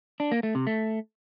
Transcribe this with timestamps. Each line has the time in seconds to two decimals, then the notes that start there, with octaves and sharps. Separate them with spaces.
0.20 D4
0.32 A#3
0.43 A3
0.55 C3
0.67 A3